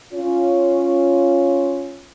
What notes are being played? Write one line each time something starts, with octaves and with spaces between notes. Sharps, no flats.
C#4 F4